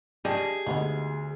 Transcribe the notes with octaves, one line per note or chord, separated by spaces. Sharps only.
D4 G4 G#4 D#5 A5
D2 G#3 B3 D#4